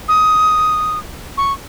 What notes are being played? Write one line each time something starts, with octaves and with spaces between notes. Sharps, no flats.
D#6
C#6